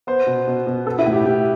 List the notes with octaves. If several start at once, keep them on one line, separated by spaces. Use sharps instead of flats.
B3 C5
B2
B2
B2
B3 A4
E4
A2
G4
A2 G4